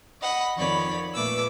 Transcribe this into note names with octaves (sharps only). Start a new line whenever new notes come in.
D#5 F#5 B5
F2 D#3 C#5 D5 B5
A#2 A3 B4 D6 E6